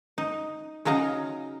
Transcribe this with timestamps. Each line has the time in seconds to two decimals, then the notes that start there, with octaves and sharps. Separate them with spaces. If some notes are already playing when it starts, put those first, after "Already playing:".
0.18 D#4
0.85 C#3 F#3 D#4 F5 A#5